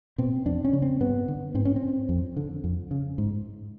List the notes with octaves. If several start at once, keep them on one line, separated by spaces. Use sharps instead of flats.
B2 C4
F2 D4
C#4
C#3
C4
G2 B3
D3
G#2 C4
C#4
C4
F2
D3
F2
C#3
G#2